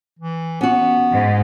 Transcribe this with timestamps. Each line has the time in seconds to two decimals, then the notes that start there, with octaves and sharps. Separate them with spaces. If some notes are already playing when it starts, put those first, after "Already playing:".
0.19 E3
0.61 B3 C#4 F#4
1.12 G#2